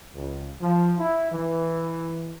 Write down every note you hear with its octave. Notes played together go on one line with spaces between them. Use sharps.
C#2
F3
E4
E3